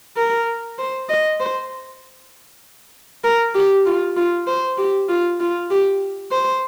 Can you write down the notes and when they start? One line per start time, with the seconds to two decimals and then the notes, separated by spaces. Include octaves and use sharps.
0.17 A#4
0.78 C5
1.09 D#5
1.40 C5
3.24 A#4
3.54 G4
3.86 F4
4.16 F4
4.47 C5
4.78 G4
5.09 F4
5.40 F4
5.70 G4
6.31 C5